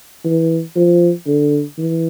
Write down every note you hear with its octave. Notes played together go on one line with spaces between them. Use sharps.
E3
F3
D3
E3